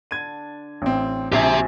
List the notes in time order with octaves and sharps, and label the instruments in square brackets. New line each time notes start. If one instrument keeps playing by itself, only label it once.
[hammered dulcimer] D3 [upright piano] G#6 D#7
[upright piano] A1 C4
[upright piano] A#1 C4 C7 [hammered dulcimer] F#2 G#4 C#5 [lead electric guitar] G4 E5